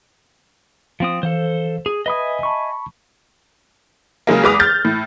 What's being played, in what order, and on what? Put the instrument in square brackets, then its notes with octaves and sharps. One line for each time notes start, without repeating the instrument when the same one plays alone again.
[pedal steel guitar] F3 C4 D#6
[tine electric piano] E3 F5 [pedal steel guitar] A4 C5
[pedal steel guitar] G#4
[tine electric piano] B4 B5 D#6 [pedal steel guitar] D#5 E5 G#5
[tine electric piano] A5 B5 C#6
[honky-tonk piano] C#3 F#3 G#3 A#3
E2 G#3 B4 D6 D#6 F7
F6 G6 A6
A2